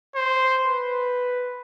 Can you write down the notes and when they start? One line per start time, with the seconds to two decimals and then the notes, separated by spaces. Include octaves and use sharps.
0.15 C5
0.65 B4